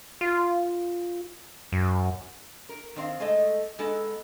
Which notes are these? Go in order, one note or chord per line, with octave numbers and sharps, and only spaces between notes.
F4
F#2
A#4
D#3 C4 F5
G#3 A3 A4 D#5
G#3 B3 D#4 A4